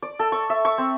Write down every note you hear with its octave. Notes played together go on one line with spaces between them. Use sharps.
D5
A4
C#6
E5
C#6
C4